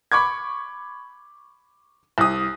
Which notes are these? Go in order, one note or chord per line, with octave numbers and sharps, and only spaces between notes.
B5 C#6 D6 G#6
C2 D#6